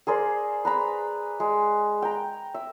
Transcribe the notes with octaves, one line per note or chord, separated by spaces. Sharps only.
G#4 A#4 C5 D5
B4 A#5 B5
G#3
G5 A#5
E5